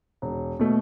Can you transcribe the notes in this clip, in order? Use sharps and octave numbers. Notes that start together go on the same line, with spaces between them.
E1
B2 A3